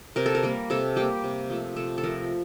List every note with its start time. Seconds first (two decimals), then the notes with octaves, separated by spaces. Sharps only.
0.16 C3 A#4
0.26 A4
0.35 A#4
0.43 G3 A#3
0.70 C3 A4
0.96 G3 A#3 G4
1.24 C3
1.50 F3 A3
1.76 C3 A4
1.98 A4
2.03 F3 A3 A#4